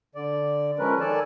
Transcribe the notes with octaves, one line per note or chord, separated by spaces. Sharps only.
D3 D5
F3 G#3 C#4 A#4 B4
D#3 A4 D5 G#5 A5